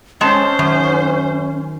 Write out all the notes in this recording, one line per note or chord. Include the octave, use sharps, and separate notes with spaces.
G#3 C4 C#4 C5 A5
F#2 D#3